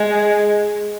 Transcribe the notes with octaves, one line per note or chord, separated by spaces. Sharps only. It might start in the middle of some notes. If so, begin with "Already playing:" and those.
Already playing: G#3